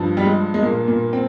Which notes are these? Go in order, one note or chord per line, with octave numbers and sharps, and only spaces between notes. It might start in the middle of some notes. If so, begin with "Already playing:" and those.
Already playing: G2 F3
G3
G#3
G#3
A#2 A#3
A#2 A#3
C4